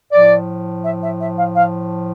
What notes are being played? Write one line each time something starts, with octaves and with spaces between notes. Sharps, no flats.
A2 F3 D5
E5
E5
E5
F5
F5